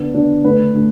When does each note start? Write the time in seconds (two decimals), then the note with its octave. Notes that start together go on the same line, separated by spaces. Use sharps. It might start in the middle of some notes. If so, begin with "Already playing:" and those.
Already playing: D3 B3 D4
0.14 D3 B3 D4
0.44 D3 A3 D4 B4
0.74 D3 A3